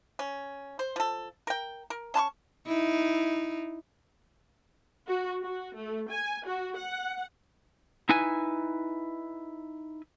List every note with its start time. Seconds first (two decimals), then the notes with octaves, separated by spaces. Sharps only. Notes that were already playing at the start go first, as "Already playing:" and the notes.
0.19 C#4
0.79 C5
0.96 F3 A4
1.47 A#4 G5
1.90 A#4
2.14 C#4 A5 C6 C#6
2.66 D#4 E4
5.07 F#4
5.42 F#4
5.77 A3
6.11 G#5
6.47 F#4
6.77 F#5
8.09 D#4 E4 B4 G#5